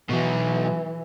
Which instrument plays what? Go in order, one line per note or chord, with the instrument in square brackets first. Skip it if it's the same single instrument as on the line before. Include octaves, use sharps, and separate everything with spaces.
[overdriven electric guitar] B2 F#3 [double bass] E3